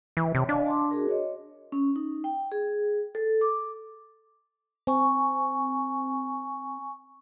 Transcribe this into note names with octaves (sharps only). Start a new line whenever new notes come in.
E3
C3 C#5
D4 D#5 F5 G#5
A5 C6 D6
F#4 G#4 A#4
C#5 D#5
C#4
D#4
G5
G#4
A4
D6
C4 G#5 C#6